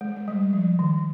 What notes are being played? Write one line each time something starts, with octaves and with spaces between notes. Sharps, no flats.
G#3
G#3
G3
F3
D#3